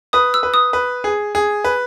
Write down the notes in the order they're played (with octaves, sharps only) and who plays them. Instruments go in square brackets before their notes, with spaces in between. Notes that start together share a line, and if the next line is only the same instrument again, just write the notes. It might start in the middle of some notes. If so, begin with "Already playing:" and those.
[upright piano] B4 [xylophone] D#6
[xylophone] E6
[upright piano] B4
[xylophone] D#6
[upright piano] B4
G#4
G#4
B4